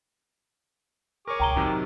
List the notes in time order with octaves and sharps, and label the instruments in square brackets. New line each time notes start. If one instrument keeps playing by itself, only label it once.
[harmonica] G#4 C#6 D6 [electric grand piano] A#4 C#5
[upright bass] C#2 B2 [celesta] G5 A#5 G7
[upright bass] A2 [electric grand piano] C3 D#3 F#3